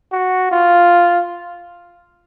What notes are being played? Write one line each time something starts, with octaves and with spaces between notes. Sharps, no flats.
F#4
F4